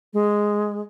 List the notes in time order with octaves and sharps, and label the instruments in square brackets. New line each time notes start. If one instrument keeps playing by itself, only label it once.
[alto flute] G#3